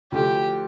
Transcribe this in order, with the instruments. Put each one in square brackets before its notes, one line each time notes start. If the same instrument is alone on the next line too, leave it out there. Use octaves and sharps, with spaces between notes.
[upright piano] D2 D3 F3 [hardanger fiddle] G4